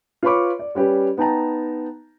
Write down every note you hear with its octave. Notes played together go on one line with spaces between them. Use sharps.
F4 B4 C#5 B5 C#6 D6
D5
G3 C#4 G4 B4
B3 D#4 G5 A5 A#5